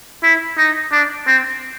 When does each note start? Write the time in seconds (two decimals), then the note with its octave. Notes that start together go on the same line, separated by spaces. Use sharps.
0.24 E4
0.58 D#4
0.92 D4
1.27 C4